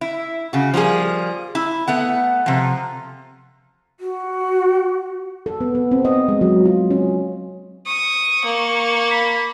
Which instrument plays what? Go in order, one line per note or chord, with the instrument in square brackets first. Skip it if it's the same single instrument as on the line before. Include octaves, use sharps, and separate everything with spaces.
[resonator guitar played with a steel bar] E4
C#3 F#4
F3 G3 A#3 G#4
E4
A3 B3 F#5
C3 F3
[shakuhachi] F#4
[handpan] A4
B3
B3
C4
D#5
G#3
F#3
F4
C#4
[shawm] C#6 [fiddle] D#6
[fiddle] A#3
[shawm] B5